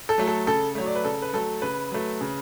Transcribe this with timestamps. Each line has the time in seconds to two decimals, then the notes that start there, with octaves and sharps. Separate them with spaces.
0.09 A4
0.18 F#3 A3
0.27 A4
0.47 C#3 A4
0.75 F#3 A3 C#5
0.86 D5
0.95 B4
1.04 C#3 A4
1.22 B4
1.33 F#3 A3 A4
1.62 C#3 B4
1.91 F#3 A3
2.21 C#3